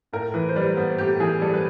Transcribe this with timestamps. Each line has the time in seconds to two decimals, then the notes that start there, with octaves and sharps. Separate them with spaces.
0.13 A2 A#4
0.34 E3 B4
0.49 C5
0.55 G3 B4
0.76 B3 C5
0.98 A2 G4
1.20 E3 G#4
1.41 G3 A4
1.54 B4